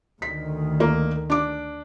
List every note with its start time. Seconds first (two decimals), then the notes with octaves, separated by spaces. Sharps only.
0.22 D2 D#3 B6
0.80 A#3
1.30 D4 D6